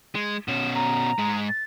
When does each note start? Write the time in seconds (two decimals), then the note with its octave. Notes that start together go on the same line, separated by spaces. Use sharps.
0.15 G#3
0.48 B2 C#4 E7
0.75 A#5
1.19 G#2 G#3
1.49 A6